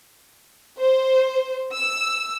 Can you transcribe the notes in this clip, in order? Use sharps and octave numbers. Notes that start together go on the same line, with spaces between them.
C5
E6